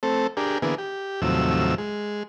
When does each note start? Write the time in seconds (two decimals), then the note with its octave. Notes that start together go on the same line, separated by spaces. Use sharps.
0.03 A3 C4 A4
0.37 D4 G4 G#4 A#4
0.62 D3 E3 A#3 B3 G#4
0.78 G4
1.22 D#2 A2 C3 F3 F#3 E6
1.78 G#3